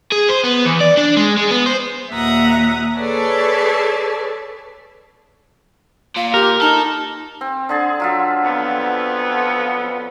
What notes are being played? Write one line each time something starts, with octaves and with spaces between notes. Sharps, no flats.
G#4
C5
B3
E2
D5
D4
G#3
G#3
B3
C5
D#2 A#2 E5 F#5 A#5 D#6
G#4 A4 B4 C#5 D5 A5
A#2 F5
G4 A#4
D#4 A4
C4
D3 G#4 A5
F#3 F4 E5
F2 B3